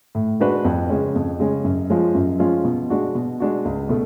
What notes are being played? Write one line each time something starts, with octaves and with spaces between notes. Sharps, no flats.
A2
G#3 D4 F#4 B4
F2
C#3 G#3 C#4
F2
C#3 G#3 C#4
F#2
F3 G#3 C#4 F4
F#2
F3 G#3 C#4 F4
B2
G#3 D4 F#4
B2
G#3 D4 F#4
C#2
B2 A3